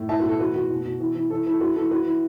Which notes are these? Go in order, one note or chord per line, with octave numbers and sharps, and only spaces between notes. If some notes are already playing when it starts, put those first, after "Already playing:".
Already playing: A2
E4 E5 A5
F#4 B4
B2 A4
E3 F#4 B4
E3 F#4
B2
B2
E3
E3
E3 A4
E3 A4
E3 F#4 B4
E3 A4
E4 F#4 B4
E3